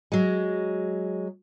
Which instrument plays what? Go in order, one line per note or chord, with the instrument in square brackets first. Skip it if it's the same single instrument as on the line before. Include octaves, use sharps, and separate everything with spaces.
[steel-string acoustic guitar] F#3 G#3